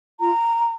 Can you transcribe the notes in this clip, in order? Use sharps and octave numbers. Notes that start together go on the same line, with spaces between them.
F4 A#5